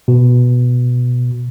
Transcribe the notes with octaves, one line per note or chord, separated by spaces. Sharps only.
B2